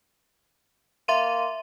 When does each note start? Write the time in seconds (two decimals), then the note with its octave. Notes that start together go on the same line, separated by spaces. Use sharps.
1.08 A#3 E5 C6 D#7